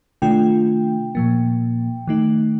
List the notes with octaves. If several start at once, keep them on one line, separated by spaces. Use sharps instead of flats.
C3 D#3 A3 D4 F4 G5
A#2 F3 A#3
D#3 A3 D#4